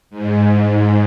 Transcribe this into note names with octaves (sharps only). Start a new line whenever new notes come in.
G#2